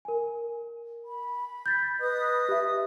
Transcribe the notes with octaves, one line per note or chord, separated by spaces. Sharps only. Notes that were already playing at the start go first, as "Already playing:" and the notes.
A#4 G#5
B5
G6 A6 B6
B4 D#5 D#6
G4 E5